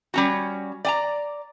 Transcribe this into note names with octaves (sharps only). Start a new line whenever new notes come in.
G3 C#4 F#4
D5 G#5 A#5